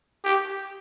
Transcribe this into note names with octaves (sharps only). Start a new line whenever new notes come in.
G4